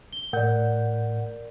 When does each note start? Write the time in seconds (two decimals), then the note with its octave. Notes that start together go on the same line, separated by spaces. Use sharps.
0.13 G7
0.33 A2 A#4 D5 F#5 G6